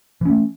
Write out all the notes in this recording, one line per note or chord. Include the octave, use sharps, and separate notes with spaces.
E3 A3 C#4